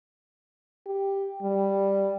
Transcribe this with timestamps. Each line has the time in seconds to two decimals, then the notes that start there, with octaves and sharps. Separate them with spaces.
0.86 G4
1.42 G3